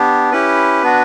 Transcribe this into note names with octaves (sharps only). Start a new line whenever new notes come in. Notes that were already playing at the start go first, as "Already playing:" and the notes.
Already playing: B3 D4 G4
C#4 E4 G4 B4
B3 D4 F#4